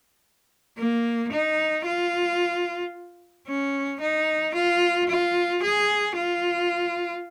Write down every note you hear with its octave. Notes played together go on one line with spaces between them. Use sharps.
A#3
D#4
F4
C#4
D#4
F4
F4
G#4
F4